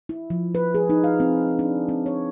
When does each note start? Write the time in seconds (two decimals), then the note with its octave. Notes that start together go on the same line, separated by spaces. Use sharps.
0.09 E4
0.30 F3
0.55 B4
0.75 G#4
0.90 D#4
1.04 F5
1.20 C4
1.59 D4
1.89 C4
2.06 C#5